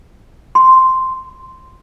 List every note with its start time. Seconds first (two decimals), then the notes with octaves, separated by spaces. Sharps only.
0.55 C6